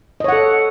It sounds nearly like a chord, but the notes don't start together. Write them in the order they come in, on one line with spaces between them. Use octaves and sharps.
D#5 C#5 F#5 A4